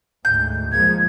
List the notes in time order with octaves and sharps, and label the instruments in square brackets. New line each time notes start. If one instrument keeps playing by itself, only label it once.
[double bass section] D2 G#2 [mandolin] G6
[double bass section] F3 G#3 A#3 [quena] G#6